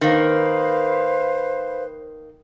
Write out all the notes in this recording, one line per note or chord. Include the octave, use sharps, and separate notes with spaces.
D#3 A#3 B4 C5 F5